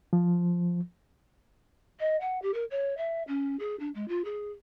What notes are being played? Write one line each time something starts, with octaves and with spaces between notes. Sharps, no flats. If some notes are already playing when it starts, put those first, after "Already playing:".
F3
D#5
F#5
G4
A#4
C#5
E5
C#4
G#4
D4
G#3
F4
G#4